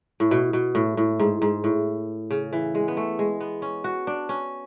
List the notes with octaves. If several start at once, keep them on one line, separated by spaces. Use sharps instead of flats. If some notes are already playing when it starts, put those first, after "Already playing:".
A2
B2
B2
A2
A2
G#2
G#2
A2
C#3
E3
G#3
B3
A3
G#3
B3
C#4
F#4
D4
C#4